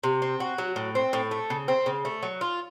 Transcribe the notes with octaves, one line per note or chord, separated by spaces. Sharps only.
C3
C4
F#4
F#3
A2
C4
A2
A3
C#3
C4
C#3
A3
F#3
F4